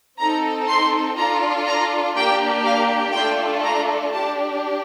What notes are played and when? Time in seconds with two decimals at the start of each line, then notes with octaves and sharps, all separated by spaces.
0.18 C4 D#4 A4 A#5
0.68 C6
1.17 D4 F4 A4 A#5
1.66 A#5
2.15 A#3 D4 G4 G5
2.64 F5
3.13 A3 D4 F4 A4 G5
3.62 A#5
4.12 D4 G4 A5